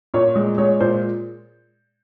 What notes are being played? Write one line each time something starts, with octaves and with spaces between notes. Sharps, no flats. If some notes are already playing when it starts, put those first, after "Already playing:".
A#2 C#5
G#3
G#3 C#5
A#2 C5